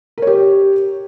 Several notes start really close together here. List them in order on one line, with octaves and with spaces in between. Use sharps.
A#4 C#5 G4